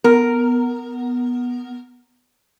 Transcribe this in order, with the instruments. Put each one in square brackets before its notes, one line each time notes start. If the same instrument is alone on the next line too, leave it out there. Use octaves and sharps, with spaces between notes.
[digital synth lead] B3 [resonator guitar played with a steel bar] A#4